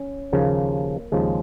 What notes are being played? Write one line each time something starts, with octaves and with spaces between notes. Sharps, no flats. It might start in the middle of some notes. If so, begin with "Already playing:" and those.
Already playing: C#4
D#2 C#3 F3 A#3
D#2 C#3 F3 G#3